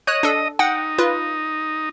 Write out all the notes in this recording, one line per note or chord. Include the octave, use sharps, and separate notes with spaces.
C#5 D#5 F#6
D4 A4
D#4 F#5 G5
F4 B4